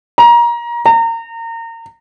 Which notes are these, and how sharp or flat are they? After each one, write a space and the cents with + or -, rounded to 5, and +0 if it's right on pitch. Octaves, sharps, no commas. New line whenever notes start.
A#5 +25
A#5 -30